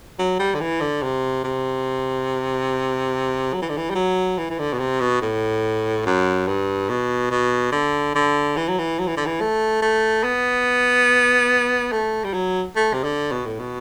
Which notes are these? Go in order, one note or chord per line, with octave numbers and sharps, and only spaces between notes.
F#3
G3
D3
E3
D3
C3
C3
F#3
E3
D3
E3
G3
F#3
E3
E3
D3
B2
C3
B2
A2
F#2
G2
B2
B2
D3
D3
E3
F#3
E3
F#3
E3
D3
E3
A3
A3
B3
A3
G3
F#3
A3
C3
D3
B2
A2
B2